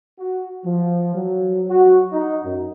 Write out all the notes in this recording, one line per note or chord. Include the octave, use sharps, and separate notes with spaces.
F#4
F3
F#3
F#4
D#4
F#2